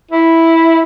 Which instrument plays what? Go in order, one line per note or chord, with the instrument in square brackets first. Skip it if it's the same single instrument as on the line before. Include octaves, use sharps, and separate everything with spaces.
[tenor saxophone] E4